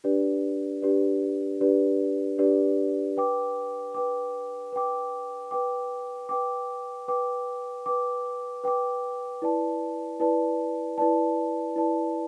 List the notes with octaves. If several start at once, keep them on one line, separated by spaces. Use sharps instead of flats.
D4 G4 B4 D5
D4 G4 B4 D5
D4 G4 B4 D5
D4 G4 B4 D5
B4 G5 D6
B4 G5 D6
B4 G5 D6
B4 G5 D6
B4 G5 D6
B4 G5 D6
B4 G5 D6
B4 G5 D6
E4 B4 D5 A5
E4 B4 D5 A5
E4 B4 D5 A5
E4 B4 D5 A5